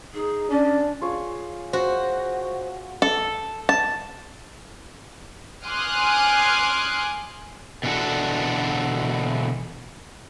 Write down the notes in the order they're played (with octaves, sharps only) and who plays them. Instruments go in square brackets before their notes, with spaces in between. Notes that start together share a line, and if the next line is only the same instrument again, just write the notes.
[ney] D#4 [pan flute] G#4
[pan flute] C#4 [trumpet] D4 [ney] D5
[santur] F4 G#4 C#5
[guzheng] F#4 [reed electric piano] C5
[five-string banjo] A4
A5
[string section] G#5 C6 D6 D#6 F6 F#6
[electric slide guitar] B2 D3 E3 D4 F#4 A4